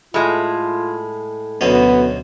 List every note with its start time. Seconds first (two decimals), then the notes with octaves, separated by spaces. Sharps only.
0.14 A2 G#3 F4
1.61 D2 B2 F#3 B3 C#4